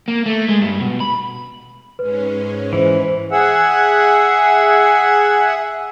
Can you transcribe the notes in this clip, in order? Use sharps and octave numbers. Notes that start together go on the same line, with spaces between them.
A#3
A3
G#3
G2
B2
B5
G#2 G#3 C#4 B4
E3 C5
G#4 E5 F#5